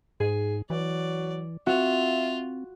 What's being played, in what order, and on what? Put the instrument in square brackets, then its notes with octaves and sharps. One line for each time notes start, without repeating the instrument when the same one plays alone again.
[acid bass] G#2 [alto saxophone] G#4
[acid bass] E3 [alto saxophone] F#3 [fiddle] D5
[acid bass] C4 [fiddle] F4 [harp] F#4 [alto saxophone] E5